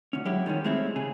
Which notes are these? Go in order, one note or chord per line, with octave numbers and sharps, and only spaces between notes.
D2 C#4
F#3 G#3 C#4 E4 G4
D#3 F3 G3 C#4
G#3 A3 C4 C#4 E4
C#3 G#4